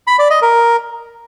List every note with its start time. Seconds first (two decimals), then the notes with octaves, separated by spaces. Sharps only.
0.07 B5
0.19 D5
0.30 D#5
0.42 A#4